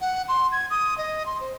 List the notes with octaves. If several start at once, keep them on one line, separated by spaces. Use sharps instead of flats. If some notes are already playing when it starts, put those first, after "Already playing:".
F#5
C6
G#6
D#6
D#5
C6
C5